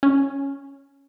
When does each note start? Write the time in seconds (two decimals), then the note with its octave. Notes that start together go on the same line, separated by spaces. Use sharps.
0.03 C#4